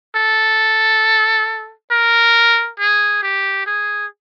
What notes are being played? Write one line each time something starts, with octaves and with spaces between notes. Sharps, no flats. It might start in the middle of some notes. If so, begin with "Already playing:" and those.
A4
A#4
G#4
G4
G#4